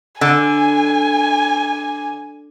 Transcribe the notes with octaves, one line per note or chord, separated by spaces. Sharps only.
D3 G#5